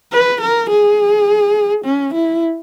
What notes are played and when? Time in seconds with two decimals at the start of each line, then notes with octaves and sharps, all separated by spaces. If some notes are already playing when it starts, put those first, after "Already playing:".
0.13 B4
0.42 A#4
0.70 G#4
1.85 C#4
2.14 E4